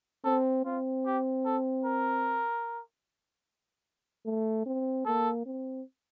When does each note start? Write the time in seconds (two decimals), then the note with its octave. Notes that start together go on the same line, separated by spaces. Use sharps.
0.25 C4 A4
0.65 C4 F4
1.06 G4
1.45 A4
1.85 A#4
4.26 A3
4.66 C4
5.06 A#3 A4
5.46 C4